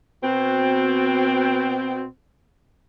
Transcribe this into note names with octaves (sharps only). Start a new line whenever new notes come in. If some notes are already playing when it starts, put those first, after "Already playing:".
B2 C4